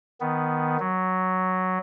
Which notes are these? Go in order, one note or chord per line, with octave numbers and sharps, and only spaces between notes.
D#3 B3
F#3